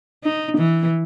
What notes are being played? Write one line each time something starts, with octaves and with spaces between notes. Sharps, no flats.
D#4
E3